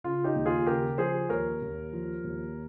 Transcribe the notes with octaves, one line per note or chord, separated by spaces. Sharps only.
C#3 F4
D#4 G4
D#2
F4 G#4
C#3 G4 A#4
F3 G#4 C5
D#2 A#4 C#5
D#2
F3
D#2